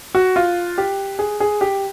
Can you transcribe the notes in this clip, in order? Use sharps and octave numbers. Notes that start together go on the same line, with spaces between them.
F#4
F4
G4
G#4
G#4
G4